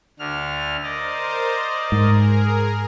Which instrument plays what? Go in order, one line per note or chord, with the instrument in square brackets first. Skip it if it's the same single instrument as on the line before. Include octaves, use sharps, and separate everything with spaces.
[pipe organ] D2 D3 F6
[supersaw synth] A#4 C5 [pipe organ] D5 D#5
[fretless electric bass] G#2 [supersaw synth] G#4 A#4